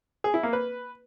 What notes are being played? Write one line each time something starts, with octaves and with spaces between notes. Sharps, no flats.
G#4
E4
A#3
B4